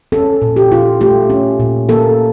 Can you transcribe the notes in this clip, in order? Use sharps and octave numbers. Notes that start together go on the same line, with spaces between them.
C#4 A4
A#2
G4
F4
A3 G4
C#4
A#2
A#3 A4